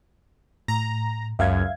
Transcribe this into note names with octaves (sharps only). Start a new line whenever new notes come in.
A2 A#5
C#2 F#2 E5 F5 G#6